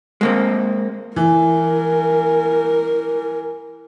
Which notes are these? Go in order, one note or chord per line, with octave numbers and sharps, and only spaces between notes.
G#3 A#3 C4
E3 A#4